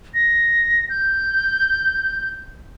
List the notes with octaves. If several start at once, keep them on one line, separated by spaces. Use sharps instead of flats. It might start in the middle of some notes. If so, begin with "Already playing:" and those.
A#6
G6